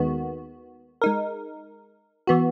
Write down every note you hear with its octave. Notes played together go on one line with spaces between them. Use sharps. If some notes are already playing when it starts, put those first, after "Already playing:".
Already playing: D#2 D#3 G#3 B3 F#4
G#3 D#4 A#4
E3 B3 F#4